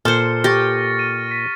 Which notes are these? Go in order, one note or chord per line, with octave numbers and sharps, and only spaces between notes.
A#2 A4 C5 F6 C#7
G4 C#6 A6 A#6
D#7
B6